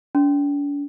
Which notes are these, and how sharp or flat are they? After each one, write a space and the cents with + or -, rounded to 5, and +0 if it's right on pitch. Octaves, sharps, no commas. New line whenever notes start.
D4 -45